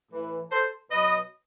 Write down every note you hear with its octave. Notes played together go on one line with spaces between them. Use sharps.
A2 E3
A4 C5
B2 F#3 B4 D#5